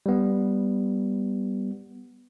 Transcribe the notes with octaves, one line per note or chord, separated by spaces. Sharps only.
G3 B3